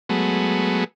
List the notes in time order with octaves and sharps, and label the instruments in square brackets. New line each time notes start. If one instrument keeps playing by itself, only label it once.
[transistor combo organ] F#3 G#3 A3 B3